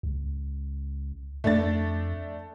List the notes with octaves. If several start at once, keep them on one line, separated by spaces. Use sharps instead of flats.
C#2
F2 A3 D4 A6